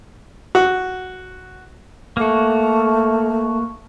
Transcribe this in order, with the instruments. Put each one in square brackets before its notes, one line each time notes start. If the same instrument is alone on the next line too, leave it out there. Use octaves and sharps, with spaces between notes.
[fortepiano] F#4
[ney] A3 [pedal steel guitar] A#3 F#4